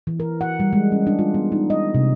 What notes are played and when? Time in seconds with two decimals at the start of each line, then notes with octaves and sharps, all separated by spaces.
0.07 E3
0.20 A#4
0.41 F#5
0.60 G3
0.73 G#3
0.92 C#4
1.07 D4
1.19 F4
1.34 B3
1.52 D#4
1.70 D#5
1.94 C3